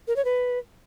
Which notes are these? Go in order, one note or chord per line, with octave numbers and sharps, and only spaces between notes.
A#4
C#5
B4